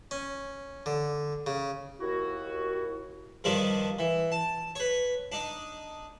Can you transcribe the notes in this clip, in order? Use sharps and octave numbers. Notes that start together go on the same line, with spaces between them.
C#4
D3
C#3
D#2 E4 F#4
G2 D#3 F3 G3 D4 D#4
E3
A5
B4 C#5
D4 D#4